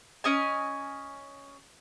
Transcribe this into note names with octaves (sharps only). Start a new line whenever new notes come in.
C#4 D#5 G#5